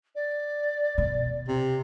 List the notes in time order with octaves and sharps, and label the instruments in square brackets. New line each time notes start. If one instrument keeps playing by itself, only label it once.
[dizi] D5
[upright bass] B2
[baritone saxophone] C3